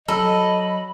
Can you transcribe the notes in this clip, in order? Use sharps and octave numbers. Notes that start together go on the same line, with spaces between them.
F#3 A4 D#5 B5